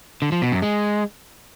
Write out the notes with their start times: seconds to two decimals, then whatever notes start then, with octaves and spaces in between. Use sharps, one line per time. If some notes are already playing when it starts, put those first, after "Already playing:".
0.22 D3
0.32 F3
0.42 B2
0.52 F#2
0.62 G#3